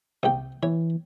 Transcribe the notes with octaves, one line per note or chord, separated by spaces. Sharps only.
C2 G5
E3 C#5